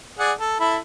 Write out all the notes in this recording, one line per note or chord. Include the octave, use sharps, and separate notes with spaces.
G#4 D5 F#5
A4
E4 A4 B5